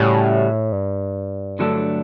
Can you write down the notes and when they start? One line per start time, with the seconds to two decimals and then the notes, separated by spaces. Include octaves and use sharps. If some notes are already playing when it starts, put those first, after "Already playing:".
Already playing: A2 C#3 G3 C#4 F#4
0.72 G2
1.59 D3 F#3 A3 D4 A4